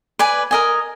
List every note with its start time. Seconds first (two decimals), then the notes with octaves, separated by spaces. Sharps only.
0.19 B4 D5 G#5
0.51 A#4 D#5 G#5